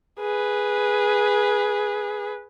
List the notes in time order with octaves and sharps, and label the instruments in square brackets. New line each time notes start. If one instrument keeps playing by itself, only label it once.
[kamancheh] G#4 B4